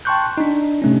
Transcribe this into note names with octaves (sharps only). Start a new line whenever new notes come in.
G5 A5 C6 C#6 F#6 G6
D4 D#4
C3 A3 C#4